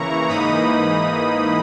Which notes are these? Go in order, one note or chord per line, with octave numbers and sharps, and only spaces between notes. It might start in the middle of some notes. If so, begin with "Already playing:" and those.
Already playing: C#3 E3 A#3 E4 A#5 C#6
G#2 E3 A#3 D#4 B5 D#6